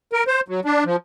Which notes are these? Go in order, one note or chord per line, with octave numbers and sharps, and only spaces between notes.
A#4
C5
F#3
D4
F3